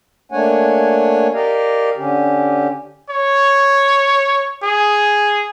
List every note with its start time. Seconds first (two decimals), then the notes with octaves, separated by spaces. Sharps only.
0.32 A3 A#3 D4 C#5 F#5 G#5
1.33 G4 A#4 D5 D#5 F5
1.97 D3 C#4 G4
3.10 C#5
4.63 G#4